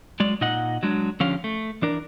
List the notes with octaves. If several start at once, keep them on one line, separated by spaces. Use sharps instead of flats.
F#3 G#3 D5
A#2 D#4 D#5 F#5
F#3 G#3 D4
D3 F3 C#4 G4 F5
A3
E3 D4 A#4